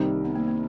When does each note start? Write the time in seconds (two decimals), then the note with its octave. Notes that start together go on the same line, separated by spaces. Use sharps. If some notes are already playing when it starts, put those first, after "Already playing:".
Already playing: C2 C3 D#3 G3 A#3 C4
0.25 B3
0.35 A#3
0.48 A#3